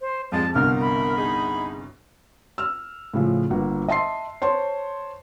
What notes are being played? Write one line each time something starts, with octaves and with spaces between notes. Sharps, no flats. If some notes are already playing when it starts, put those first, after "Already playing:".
C5
F2 F3 G3 G#3 A5
G1 C2 B2 A#4 F6
B5
D#4 G#4
E6 F6
A2 C#3 F3
G1 A#3 F#4
D#5 E5 A5 C6 C7
C5 C#5 A5 C6